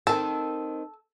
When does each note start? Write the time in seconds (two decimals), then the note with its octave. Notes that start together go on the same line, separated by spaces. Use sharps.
0.07 D#3 C4 A4